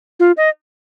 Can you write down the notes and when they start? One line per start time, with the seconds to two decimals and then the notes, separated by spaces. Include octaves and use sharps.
0.20 F4
0.37 D#5